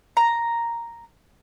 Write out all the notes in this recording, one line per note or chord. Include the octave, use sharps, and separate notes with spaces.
A#5